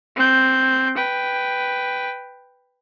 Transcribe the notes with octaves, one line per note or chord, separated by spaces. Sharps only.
C4 G6
B4 G5